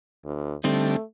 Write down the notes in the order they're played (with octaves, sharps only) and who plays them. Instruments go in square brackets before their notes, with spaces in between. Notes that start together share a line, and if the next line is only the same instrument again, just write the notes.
[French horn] D2
[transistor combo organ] D3 G3 [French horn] A3 [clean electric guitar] C4 D#4